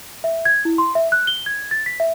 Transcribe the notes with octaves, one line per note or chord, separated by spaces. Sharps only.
E5
G#6
E4
C6
E5
F#6
G7
G#6
A6
B6
E5